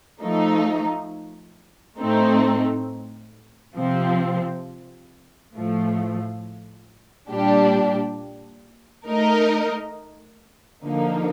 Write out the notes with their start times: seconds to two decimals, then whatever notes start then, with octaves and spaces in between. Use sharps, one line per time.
0.22 F3 A3 D#4
1.99 A2 A3 C4 D#4
3.76 C3 F3 C4
5.53 A2 F3 A3
7.30 A#2 G3 D4 G4
9.08 A3 D#4 A#4 D#5
10.84 D3 F3 A#3 D#4